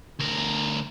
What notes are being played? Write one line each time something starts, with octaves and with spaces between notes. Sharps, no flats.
D2 A#4